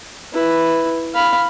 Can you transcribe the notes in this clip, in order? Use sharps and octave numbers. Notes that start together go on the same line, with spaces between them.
E4 B4
F5 B5